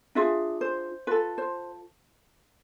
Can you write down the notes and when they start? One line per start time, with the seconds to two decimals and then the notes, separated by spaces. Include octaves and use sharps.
0.15 D4 F4 G#4 E5
0.61 C5
1.07 F4 A4 B4
1.38 C5